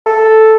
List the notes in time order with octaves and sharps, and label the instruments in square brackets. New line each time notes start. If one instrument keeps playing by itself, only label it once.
[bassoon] A4